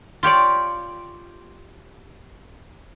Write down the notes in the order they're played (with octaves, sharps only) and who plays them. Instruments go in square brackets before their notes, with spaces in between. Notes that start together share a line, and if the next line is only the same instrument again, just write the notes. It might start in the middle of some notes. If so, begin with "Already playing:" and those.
[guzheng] F4 G4 C#5 D5